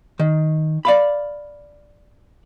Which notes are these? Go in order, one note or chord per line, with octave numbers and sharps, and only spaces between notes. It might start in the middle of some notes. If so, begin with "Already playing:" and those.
D#3
D5 F5 B5